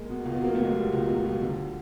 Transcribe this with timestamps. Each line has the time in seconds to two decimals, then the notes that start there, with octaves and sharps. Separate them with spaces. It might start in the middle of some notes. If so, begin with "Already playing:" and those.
Already playing: G#3 A#3
0.09 B2
0.25 C#2
0.34 B3
0.42 F#3 A#3
0.55 C#2 A3
0.65 G#3
0.75 B2 G3
0.92 C#2
1.09 F#3
1.25 C#2
1.42 D3